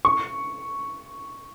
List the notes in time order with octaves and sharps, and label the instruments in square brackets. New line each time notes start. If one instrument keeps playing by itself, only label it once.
[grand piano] C#6